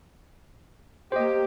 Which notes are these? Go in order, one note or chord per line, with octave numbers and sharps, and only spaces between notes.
A#3 G4 C5 D#5